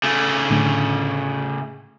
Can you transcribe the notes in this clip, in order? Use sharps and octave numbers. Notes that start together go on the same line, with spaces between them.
C#3 A3
A2 D3